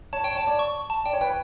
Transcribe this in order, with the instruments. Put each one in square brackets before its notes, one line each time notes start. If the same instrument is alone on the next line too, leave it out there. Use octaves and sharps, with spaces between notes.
[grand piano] C#5 [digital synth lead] A5
[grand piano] C#5 [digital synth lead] G5
[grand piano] C#5 [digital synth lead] A5
[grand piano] D5
[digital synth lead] C#6
A5
[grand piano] D5 [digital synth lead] G5
[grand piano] C#5
[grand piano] B4 [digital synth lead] G5